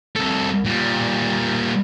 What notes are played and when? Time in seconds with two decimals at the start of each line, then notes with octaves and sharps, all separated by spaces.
0.16 C2 A4
0.66 A#2 G3